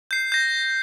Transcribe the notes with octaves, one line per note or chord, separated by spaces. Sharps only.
G6 C7
G6 A#6